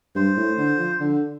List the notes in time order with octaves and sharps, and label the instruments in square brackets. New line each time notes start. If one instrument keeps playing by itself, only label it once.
[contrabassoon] G2 [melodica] C5
[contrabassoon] A2
D3
F3
D3